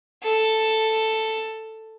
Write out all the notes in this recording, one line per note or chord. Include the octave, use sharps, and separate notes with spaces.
A4